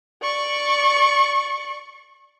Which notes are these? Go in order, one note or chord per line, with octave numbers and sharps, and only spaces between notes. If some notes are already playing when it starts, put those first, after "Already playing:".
D5 C#6